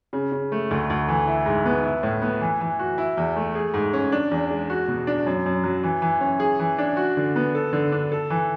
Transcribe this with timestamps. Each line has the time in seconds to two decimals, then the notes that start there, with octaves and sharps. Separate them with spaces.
0.13 C#3
0.32 C#3
0.52 A3
0.71 D2
0.90 D2
1.08 E3
1.28 E4
1.46 G#2
1.66 B3
1.84 E4
2.03 A2
2.22 B3
2.41 E3
2.61 E3
2.79 F#4
2.98 E4
3.17 E2
3.36 A3
3.55 G#4
3.74 G#2
3.93 C#4
4.12 D4
4.31 E2
4.50 G#3
4.70 F#4
4.88 B2
5.07 D4
5.26 F#2
5.46 F#2
5.64 F#3
5.83 E3
6.02 E3
6.21 C#4
6.40 G#4
6.59 E3
6.78 D4
6.97 F#4
7.17 D3
7.36 B3
7.55 A4
7.73 D3
7.92 D4
8.12 A4
8.30 E3